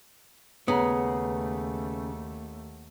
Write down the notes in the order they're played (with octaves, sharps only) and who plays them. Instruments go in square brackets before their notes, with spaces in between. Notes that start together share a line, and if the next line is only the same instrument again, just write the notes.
[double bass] D#2 A3 [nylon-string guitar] C#3 [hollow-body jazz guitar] B3 [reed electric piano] F#5 A#5 D#6